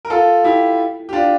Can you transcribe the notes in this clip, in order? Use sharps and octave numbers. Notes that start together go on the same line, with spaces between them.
A#4
F4 A4
E4 G4
G4
D4 F4